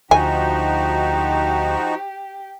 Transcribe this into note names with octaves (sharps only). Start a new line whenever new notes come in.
D2 F3 D#4 F#4 G4 G#5